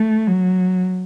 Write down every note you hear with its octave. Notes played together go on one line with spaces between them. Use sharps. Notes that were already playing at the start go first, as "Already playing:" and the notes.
Already playing: A3
F#3